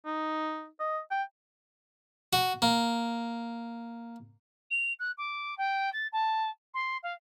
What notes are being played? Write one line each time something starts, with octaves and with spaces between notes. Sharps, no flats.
D#4
D#5
G5
F#4
A#3
F7
F#6
D6
G5
A6
A5
C6
F5